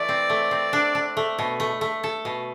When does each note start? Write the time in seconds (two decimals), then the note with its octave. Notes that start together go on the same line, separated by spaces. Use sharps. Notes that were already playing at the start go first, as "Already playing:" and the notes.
Already playing: E3 A3 D5
0.09 C4
0.30 A3
0.51 C4
0.73 D4
0.95 D4
1.17 A3
1.39 B2
1.60 A3
1.81 A3
2.04 A4
2.25 B2